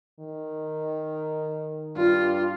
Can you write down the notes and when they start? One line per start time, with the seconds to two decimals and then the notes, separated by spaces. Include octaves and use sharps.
0.20 D#3
1.97 G2 F4